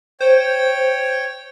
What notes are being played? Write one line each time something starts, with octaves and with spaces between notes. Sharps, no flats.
C5 C#5 G5